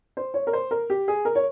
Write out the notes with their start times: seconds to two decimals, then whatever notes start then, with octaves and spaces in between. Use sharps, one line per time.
0.17 C5
0.34 C#5
0.47 A#4
0.53 C5
0.71 A#4
0.90 G4
1.08 G#4
1.25 A#4
1.35 C#5